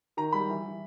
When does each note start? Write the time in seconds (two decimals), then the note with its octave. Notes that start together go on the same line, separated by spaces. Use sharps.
0.17 D#3 A#5
0.33 G3 B5
0.49 E3
0.65 E3